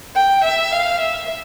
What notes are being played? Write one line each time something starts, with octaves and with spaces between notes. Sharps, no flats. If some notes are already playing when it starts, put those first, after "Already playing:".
G5
E5
F5
E5